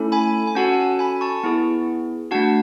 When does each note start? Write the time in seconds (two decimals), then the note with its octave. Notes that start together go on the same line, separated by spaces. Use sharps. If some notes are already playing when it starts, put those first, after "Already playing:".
Already playing: A3 C#4 E4 A4
0.12 G#5 B5
0.47 G#5
0.55 C#4 F#4 A4 F#5 A5
0.99 G#5 B5
1.21 A5 C#6
1.43 B3 E4 G#4
2.31 A3 D4 F#4 F#5 A5